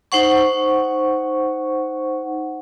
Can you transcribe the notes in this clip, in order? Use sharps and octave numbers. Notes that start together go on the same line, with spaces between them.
D#4 C5 F#5 C#6